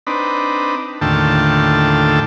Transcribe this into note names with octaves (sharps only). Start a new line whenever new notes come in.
C4 D4 D#4 B4
D#2 A2 D3 F4 G5 A5